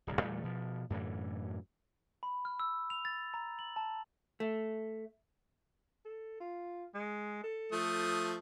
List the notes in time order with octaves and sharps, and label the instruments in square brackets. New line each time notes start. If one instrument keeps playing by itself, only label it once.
[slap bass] D1 C2
E2 A#2 G3 A3
B2 F3
F#2 A2 D3 E3
[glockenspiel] B5
F6
E6
F7
A6
A#5
F#7
A5
[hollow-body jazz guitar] A3
[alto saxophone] A4
F4
G#3
A4
[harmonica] F3 A3 D#6